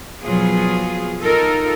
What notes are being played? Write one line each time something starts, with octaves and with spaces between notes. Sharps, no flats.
B2 F3 F#3 F4 G#4
D#4 F4 A4 A#4